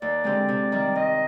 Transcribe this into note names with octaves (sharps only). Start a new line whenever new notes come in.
D#2 D5
D3 G#3 C4 G4
C3
D#3 G3
G2 D#5